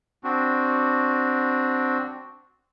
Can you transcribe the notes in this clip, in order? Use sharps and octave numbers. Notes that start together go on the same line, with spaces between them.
C4 D4 F#4